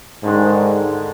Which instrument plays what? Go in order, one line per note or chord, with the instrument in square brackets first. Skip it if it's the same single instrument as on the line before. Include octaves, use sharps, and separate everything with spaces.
[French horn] G#2 [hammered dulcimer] D3 D#3 G#3